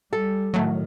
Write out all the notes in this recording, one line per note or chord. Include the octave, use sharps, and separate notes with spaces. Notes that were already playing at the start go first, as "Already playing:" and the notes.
G3 A4
A2 D#3 F#3 A3